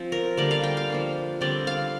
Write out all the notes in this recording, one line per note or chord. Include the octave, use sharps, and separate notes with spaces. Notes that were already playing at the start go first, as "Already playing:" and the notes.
Already playing: F3 C4
A#4
D3 G3 A#3 D4 D5
F5
G5
F5
F3 A#3 D4
D3 G3 C4 D5
F5